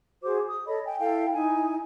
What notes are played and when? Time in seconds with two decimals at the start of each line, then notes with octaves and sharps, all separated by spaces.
0.24 F#4 G#4 C5 D6
0.48 D#6
0.67 A4 C#5 D#5 B5
0.85 G5 G#5
0.99 E4 A4 F5 G5
1.34 D#4 E4 G#5